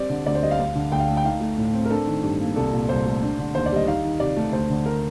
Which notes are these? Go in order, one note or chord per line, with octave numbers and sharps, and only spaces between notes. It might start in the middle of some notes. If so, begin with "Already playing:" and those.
Already playing: G3 C4 D5
D3
D2 D5
C5
G3 D#5
F5
D2
D3
D2 G5
F5
A3
G5
D#4 F5
A3
A2
C4
A#4
D4 A4
D#3
G2
A#3
C2 A4
A#2
C2 C5
A3
D4
D3
D#2 C5
D5
G3 D#5
D#4 F5
D#3
C3 D5
A3
D2 C5
D3
A#4